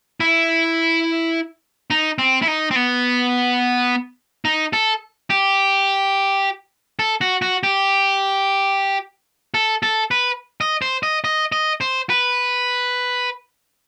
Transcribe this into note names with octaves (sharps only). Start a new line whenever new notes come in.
E4
D#4
C4
E4
D#4
C4
B3
D#4
A4
G4
A4
F#4
F#4
G4
A4
A4
B4
D#5
C5
D#5
D#5
D#5
C5
B4